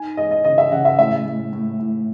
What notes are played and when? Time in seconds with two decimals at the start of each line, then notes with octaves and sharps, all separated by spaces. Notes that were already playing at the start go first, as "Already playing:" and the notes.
Already playing: D#4 G#5
0.17 G#3 D#5
0.31 D#5
0.44 C#3 D#5
0.58 E5
0.72 C#3 F#5
0.85 E5
0.99 A2 E5
1.26 A2
1.53 A2
1.80 A2